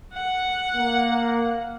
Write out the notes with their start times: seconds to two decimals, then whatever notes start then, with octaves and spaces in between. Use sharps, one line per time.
0.13 F#5
0.75 A#3